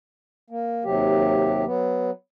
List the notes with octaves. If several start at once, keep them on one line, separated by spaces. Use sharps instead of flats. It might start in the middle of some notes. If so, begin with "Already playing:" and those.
A#3
D#2 C3 F#3 G4
F#3 B3